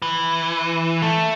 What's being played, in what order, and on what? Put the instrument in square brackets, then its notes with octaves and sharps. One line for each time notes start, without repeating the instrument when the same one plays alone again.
[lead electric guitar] E3
A3